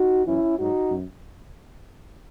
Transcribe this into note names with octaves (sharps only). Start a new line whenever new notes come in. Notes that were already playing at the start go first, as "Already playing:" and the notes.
Already playing: D#4 F#4
F#2 E3 C#4 E4
G#2 F#3 D#4 F#4
F#2